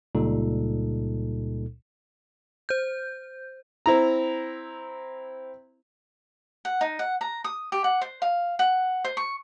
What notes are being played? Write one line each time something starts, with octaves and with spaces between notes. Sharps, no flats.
C#2 A#2 G3 D#4 A4
C5 G6
C4 E4 A#5
F#5
D#4
F#5
A#5
D#6
G4
F#5
C5
F5
F#5
C5
C#6